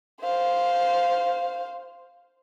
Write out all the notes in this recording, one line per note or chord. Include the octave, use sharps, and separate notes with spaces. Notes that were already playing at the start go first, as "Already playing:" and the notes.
C5 F5